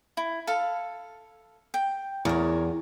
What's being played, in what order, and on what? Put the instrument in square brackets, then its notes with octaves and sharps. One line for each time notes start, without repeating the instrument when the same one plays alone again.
[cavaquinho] E4
A4 F5 A5
G5
[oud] E2 [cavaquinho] A#4 C#5